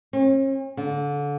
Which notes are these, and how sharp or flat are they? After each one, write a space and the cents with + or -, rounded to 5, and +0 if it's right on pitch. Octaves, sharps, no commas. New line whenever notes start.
C#4 -45
D3 -25